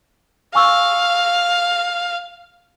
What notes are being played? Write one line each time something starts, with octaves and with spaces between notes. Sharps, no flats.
F5 G#5 C#6 E6